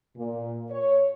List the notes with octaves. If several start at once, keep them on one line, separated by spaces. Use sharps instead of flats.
A#2
C#5